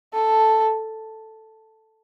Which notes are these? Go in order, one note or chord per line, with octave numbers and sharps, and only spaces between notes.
A4